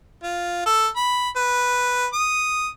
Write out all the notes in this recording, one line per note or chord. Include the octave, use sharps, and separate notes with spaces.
F4
A4
B5
B4
D#6